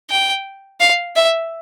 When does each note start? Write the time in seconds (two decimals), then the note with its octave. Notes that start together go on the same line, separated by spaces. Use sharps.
0.10 G5
0.80 F5
1.16 E5